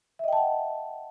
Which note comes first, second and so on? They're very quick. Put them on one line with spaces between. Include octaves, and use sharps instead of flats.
E5 D#5 G5 A5 F#5